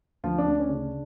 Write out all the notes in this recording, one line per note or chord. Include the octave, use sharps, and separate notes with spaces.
D2 F3 F4
D4
D2
C#4
C#3 D4